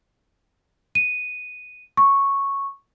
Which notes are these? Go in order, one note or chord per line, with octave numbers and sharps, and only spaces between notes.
D#7
C#6